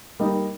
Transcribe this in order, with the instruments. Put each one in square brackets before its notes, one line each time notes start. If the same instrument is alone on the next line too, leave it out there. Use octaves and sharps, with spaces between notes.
[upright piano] G3 A#3 D#4